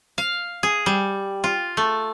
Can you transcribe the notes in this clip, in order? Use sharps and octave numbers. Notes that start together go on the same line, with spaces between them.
F5
G#4
G3
F4
A3